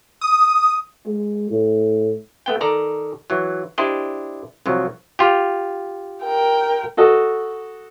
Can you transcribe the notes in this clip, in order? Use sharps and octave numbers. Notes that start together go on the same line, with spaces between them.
D#6
G#3
A2
A3 B3 G5
D#3 A4 D5 A#5
E3 F#3
D4 E4 G4 C5 D5 D#5
C2 F3 F#3
F4 G4
A#4 G5
F#4 A4 D#5